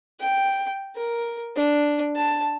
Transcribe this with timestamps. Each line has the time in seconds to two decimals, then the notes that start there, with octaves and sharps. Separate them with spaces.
0.21 G5
0.96 A#4
1.56 D4
2.16 A5